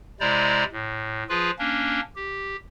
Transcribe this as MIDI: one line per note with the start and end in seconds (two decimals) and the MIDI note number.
0.21 0.64 48
0.21 0.64 56
0.21 0.64 64
0.21 0.64 72
0.21 0.64 74
0.21 0.64 82
0.72 1.23 45
1.29 1.51 53
1.29 1.51 65
1.29 1.51 68
1.29 1.51 71
1.59 2.01 58
1.59 2.01 61
1.59 2.01 62
2.16 2.56 67